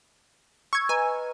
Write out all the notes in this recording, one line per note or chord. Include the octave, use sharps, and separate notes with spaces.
C#6 E6 G#6
B4 D#5 G#5 A#5